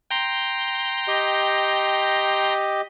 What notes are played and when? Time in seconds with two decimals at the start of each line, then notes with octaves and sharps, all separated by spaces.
0.11 G5 A#5 C6
1.08 G4 D#5